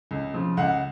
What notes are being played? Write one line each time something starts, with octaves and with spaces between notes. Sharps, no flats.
C#2
C#3 F3
C#2 F#5